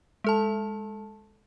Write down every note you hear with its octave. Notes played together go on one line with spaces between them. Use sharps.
G#3 A4 A5